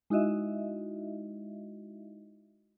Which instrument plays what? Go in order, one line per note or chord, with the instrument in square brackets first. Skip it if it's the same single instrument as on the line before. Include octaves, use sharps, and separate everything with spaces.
[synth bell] G#3 D#4 E4 F#4 D#5 E5